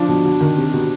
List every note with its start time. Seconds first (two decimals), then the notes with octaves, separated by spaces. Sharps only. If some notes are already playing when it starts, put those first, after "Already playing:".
Already playing: F3 D4
0.08 B2
0.25 B2
0.41 D#3
0.57 C3
0.73 B2